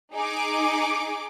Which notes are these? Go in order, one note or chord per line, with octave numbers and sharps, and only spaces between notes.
D#4 G#4 D6